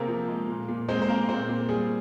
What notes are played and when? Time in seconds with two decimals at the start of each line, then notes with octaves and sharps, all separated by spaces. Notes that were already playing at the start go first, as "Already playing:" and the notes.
Already playing: C3 A#3 C4 G#4 A#4
0.08 F3
0.28 G#3
0.49 A#2
0.68 A#2
0.89 G#3 C4 C5
1.02 C5
1.08 A#3 C4 A#4
1.29 A#2 C4 C5
1.49 A#2
1.69 G3 G#4